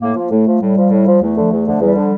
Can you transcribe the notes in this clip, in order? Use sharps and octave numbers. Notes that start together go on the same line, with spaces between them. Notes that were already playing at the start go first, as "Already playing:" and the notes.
A2 A#3
F3 A#3
A2 A3
F3
A2 G3
F3
A2
F3
E2 A3
D3 F3
E2
D3 F3
E2 G3
D3 F3